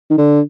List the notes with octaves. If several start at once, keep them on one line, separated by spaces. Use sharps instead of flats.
D#3
D3